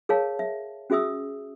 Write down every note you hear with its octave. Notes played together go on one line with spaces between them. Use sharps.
G#4 A#4 C#5 F5 A5
E5
C#4 F#4 G#4 E5 D#6 E6